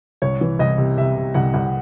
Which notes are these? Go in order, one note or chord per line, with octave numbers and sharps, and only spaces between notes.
C2 C#5
E3
C2 D#5
C3
C3 E5
C3
C2 F#5
C2